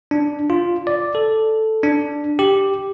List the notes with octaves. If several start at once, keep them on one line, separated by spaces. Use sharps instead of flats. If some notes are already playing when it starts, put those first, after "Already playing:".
D4
F4
D5
A4
D4
G4